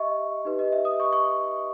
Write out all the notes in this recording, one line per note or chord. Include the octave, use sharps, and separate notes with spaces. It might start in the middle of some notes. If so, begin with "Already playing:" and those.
Already playing: G4 D#5 E5 C#6
D#4 G4 B4
D#5
E5
D#6
C#6
C#6